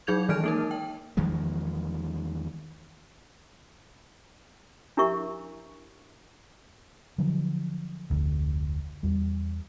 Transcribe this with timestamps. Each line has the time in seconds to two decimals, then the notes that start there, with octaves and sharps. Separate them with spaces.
0.07 F#3 D#4 G#4 G6 G#6 F7
0.29 D#3 E3 G#3 F6 D7
0.44 A#3 D#4 A#4
0.71 G5
1.17 E2 D#3 F3 G#3
4.97 D4 E4 G4 A#4 E5 C#6
7.18 D3 F3 F#3 D4
8.10 F1 D2
9.03 E2 G3